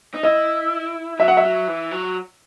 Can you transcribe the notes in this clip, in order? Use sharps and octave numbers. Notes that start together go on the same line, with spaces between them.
D#4
E4 D#5
F#3 E5
F#5
E5
F#3
E3
F#3